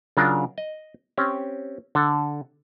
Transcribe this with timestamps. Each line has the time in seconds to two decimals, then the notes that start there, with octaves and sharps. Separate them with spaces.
0.17 C#3 F#3 D4 F4 A#4
0.58 D#5
1.17 C4 C#4 G4
1.95 D3 A4